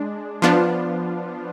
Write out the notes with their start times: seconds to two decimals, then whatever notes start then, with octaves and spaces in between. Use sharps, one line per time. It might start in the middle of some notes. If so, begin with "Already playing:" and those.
Already playing: G#3 D4
0.42 F3 B3 D4 F4